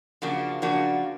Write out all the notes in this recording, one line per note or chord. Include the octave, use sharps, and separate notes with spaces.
C#3 F3 A#3 D4 F#4
C#3 F3 A#3 D4 F#4